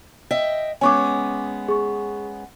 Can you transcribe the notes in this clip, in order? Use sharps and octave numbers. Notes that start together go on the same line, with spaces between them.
D#5 E5 G5
G#3 B3 C#4 G#5 C#6 D6
G#4 C#6